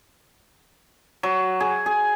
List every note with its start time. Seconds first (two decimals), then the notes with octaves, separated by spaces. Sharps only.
1.23 F#3
1.60 G#4
1.86 G#4